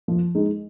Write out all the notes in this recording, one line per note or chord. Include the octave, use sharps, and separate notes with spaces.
F3
G#3 D#4